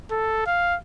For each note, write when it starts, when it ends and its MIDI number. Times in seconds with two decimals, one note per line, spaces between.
0.11 0.42 69
0.46 0.76 77